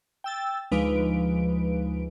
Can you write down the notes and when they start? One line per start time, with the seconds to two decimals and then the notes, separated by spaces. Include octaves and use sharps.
0.24 G5 E6 A6
0.71 D2 F3 G#3 D#4 B4 D7